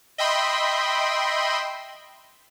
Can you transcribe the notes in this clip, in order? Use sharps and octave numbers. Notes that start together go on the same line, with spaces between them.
D#5 E5 G5 B5 C6